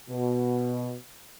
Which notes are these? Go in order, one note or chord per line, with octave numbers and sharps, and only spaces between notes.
B2